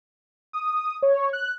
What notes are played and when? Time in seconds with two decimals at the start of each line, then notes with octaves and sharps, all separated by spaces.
0.53 D#6
1.02 C#5
1.33 F#6